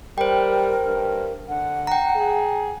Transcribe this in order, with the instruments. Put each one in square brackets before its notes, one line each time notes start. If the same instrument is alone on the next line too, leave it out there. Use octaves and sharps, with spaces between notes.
[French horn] G3 [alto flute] A#4 [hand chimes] C5 G5
[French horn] G2
[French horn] D3 [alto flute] F#5
[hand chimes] G5 A#5
[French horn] G#4